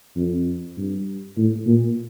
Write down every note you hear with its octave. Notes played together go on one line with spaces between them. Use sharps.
F2
G2
A2
A#2